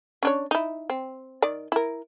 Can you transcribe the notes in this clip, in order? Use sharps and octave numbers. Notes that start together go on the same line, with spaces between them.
C#4 D4 C#5
D#4 E4
C4
D#3 D5
E4 A#4